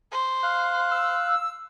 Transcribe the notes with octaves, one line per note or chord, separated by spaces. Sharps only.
C5
F5 F#6
E6